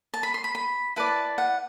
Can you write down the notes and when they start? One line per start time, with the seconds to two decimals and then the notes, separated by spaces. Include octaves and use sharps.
0.14 A5
0.23 B5
0.34 C6
0.44 B5
0.55 B5
0.96 E4 B4 D5 A5
1.38 F#5